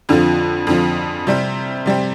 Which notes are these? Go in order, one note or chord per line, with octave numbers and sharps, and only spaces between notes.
F2 D3 F3
F2 D3 F3
C3 G3 C4
C3 G3 C4